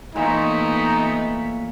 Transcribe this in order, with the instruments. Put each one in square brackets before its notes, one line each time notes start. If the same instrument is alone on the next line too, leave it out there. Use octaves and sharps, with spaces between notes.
[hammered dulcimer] A#2 C#5 [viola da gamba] E3 A3 B3 [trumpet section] D#4